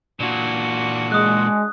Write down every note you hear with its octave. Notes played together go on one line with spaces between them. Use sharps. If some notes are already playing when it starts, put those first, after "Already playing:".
A#2 E3 D4 F#4
G#3 D#6 F#6